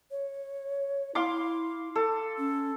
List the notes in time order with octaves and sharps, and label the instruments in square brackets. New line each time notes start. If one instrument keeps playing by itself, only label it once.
[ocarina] C#5
[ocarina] E4 [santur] F5 C6 D6
[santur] A4
[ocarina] C#4